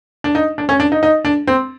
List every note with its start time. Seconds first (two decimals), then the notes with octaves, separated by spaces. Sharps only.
0.24 D4
0.35 D#4
0.58 D4
0.69 C#4
0.80 D4
0.92 D#4
1.03 D#4
1.25 D4
1.47 C4